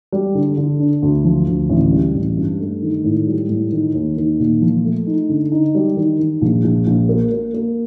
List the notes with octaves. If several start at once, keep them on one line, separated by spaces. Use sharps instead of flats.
G3
D3
D3
D4
D2
F3
D2
A1
G3
A1
G2
A3
D#3
A2
G3
A2
D#3
D#2
D#3
A#2
F3
A3
D#4
D3
D#4
G3
D#3
D#3
A#1
A#1
A#1
A#3
A#3
A#3